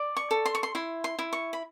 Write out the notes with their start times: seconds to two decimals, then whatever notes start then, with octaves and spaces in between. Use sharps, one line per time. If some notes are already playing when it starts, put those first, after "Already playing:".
Already playing: D5
0.17 C#6
0.31 A4
0.46 C6
0.55 C#6
0.63 C6
0.75 E4 C6
1.04 C6
1.19 E4
1.33 C#6
1.53 B5